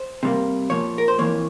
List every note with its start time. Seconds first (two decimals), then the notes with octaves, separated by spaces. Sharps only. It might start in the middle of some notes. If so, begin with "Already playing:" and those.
Already playing: C5
0.23 C3 G3 A#3
0.70 A#2 F3 A#3 C#5
0.98 A#4
1.08 C5
1.19 F2 C#3 E3 A#3 C#5